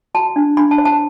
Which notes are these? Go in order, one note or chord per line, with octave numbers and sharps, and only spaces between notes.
F#4 A5
D4
D4 B5
A5
C5
A5